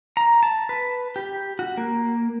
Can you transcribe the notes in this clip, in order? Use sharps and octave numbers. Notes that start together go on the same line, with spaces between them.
A#5
A5
B4
G4
F#4
A#3